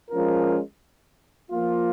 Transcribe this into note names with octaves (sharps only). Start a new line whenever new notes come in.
F3 G#3 C#4 F4 A#4
F3 A#3 F4